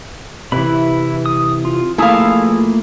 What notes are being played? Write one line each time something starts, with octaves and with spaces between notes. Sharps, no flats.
C3 E3 E4 B4 B5
D#6
F4
F3 A3 A#3 E4 F4 G#4 F5